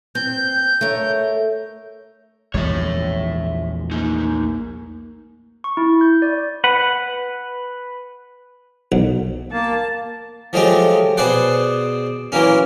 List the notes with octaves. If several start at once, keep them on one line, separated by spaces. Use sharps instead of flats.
C4 G6
A3 A#4 C#5
A#1 E2 G#3 C#5 E5
A3 A#3 D#4
C#6
E4
G6
D5
B4 F#5
B1
A#3 A5
F3 F#3 G#3 A3 G4
B2 G#4 B4 C5 D5 F#5
E3 F#3 A#3 C#4